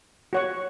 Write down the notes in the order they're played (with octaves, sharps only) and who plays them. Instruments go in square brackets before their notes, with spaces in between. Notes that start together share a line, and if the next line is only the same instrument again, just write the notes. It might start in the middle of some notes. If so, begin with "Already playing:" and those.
[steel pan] F#4 C#5 F#5 C#6